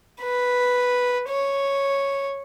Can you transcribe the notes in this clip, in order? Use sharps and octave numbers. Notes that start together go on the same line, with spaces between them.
B4
C#5